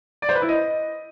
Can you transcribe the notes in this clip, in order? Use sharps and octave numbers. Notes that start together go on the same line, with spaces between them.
D5
C5
B4
E4
D#5